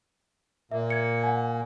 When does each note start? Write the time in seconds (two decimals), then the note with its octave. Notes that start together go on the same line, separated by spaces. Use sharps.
0.72 A#2 A#3 E5
0.90 G#6 C#7
1.24 F#5 G#5